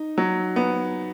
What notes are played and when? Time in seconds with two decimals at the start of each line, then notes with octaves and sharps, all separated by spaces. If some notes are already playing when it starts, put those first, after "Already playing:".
Already playing: D#4
0.18 F#3
0.56 B3